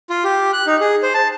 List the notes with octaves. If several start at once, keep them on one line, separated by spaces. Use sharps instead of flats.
F4
G4
F#6
D#4
G#4
C5
A5